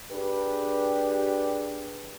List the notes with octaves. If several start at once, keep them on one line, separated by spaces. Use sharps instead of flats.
D4 G4 G#4 B4